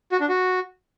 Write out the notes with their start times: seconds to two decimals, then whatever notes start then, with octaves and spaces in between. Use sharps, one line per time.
0.12 F#4
0.20 D4
0.29 F#4